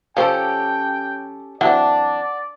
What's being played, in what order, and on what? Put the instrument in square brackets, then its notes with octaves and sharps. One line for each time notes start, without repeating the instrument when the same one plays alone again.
[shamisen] F3 C5 [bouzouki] C#4 G4 A4 [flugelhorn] G5
[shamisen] E3 F#3 C4 [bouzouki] D4 [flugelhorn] D5 [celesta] F#5